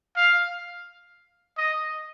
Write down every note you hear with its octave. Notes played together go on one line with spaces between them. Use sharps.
F5
D#5